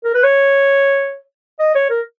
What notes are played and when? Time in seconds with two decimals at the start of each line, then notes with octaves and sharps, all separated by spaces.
0.05 A#4
0.15 B4
0.24 C#5
1.60 D#5
1.75 C#5
1.90 A#4